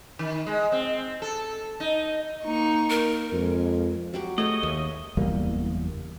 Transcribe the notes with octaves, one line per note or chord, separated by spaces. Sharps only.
D#3
G#3
C4
A4
D#4
A#3 D#4 C#6
A#4
F2 G#3
F#3 G4 F#5
A3 G#4 C#5 D#5
D#2 E5
F#1 E2 G3 A#3